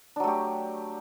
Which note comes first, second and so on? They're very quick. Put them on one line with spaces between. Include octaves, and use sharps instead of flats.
D4 F#3 A3 G4